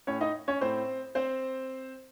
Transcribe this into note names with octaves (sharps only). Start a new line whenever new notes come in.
A2 C#4 C#5
D#4 D#5
C#4 C#5
A2 C4 C5
C4 C5